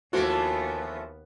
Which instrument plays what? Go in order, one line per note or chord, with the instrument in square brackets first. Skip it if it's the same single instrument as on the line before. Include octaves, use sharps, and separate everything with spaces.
[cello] D#2 B3 [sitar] E3 F3 A3 [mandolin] D4 A5 [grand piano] F#4